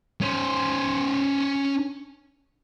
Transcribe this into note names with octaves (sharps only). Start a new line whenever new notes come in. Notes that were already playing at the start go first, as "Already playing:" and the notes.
C#4 C5